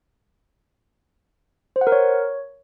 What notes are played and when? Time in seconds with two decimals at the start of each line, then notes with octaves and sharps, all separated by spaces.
1.76 C5
1.81 F#5
1.87 A#4
1.92 C#5